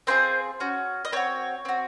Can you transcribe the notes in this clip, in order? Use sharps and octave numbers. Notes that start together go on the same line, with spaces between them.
C4 F4 G#4 C5
C#4 F#4
D#5
C4 F#4 C#5
C4 F#4